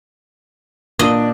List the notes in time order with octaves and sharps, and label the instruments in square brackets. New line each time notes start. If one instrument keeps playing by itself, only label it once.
[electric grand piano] A#2 [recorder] D4 [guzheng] D#5